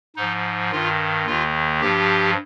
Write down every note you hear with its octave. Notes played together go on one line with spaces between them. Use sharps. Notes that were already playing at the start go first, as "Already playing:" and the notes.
G#2 F3 D#4
G2 D#3 F4
D#2 D#3 F4
G2 F3 G4